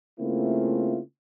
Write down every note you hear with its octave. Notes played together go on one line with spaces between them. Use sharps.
C#3 A3 A#3 C4 E4 F4